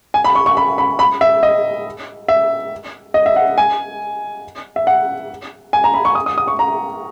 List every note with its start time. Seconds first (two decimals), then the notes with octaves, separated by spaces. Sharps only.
0.14 G#5
0.24 B5
0.35 C#6
0.46 C#6
0.57 B5
0.78 B5
0.99 B5
1.21 E5
1.43 D#5
2.28 E5
3.14 D#5
3.26 E5
3.36 F#5
3.58 G#5
4.76 E5
4.87 F#5
5.73 G#5
5.84 A#5
5.94 B5
6.05 C#6
6.15 D#6
6.26 D#6
6.38 D#6
6.48 C#6
6.59 A#5